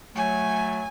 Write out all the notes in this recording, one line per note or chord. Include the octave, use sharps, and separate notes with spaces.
F#3 A3 G#5